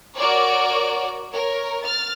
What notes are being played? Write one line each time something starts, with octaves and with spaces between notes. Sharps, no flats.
F#4 A#4 C#5 D5
A#4 C#5
F6 A6